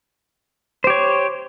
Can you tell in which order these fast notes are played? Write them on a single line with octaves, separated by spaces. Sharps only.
C5 G4 C#5